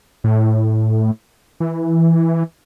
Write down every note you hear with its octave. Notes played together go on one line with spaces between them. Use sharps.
A2
E3